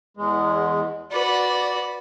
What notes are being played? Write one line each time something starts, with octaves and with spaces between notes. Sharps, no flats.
E2 G#3
F#4 B4 D5